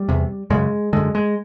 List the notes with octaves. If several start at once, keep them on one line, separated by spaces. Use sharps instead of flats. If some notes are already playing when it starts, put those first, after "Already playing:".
Already playing: G3
E2 C3
F#2 C#3 G#3
F#2 D3 G#3
G#3